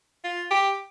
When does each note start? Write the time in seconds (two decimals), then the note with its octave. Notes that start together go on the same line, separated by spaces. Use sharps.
0.24 F4
0.51 G4